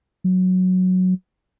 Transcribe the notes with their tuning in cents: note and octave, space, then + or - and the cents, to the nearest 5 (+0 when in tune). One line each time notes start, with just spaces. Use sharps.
F#3 -5